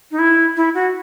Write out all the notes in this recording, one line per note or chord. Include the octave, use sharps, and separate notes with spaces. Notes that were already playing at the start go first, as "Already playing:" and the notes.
D#4
E4
E4
F#4